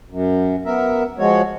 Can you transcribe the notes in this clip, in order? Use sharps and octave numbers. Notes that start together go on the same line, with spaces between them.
F#2
B3 A#4 E5
F3 G#3 F#4 C#5